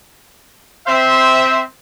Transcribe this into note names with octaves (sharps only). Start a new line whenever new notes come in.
C4 C5 E5